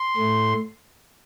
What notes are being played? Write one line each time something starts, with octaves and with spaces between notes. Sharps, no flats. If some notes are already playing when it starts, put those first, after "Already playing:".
Already playing: C6
A2 A3